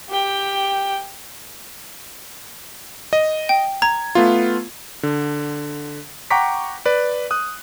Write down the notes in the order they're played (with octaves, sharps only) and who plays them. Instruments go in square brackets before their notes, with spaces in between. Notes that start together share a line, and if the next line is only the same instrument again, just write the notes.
[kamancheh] G4 G5
[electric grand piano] D#5
[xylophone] G5
[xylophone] A#5 [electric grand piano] G#6
[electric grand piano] A3 B3 F4
D3
F#5 G5 A#5 C#6 D6 B6
B4 D5
D#6 F#6